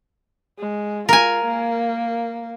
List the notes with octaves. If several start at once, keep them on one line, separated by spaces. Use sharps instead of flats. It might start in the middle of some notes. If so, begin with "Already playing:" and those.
G#3
F4 A#4 G#5
A#3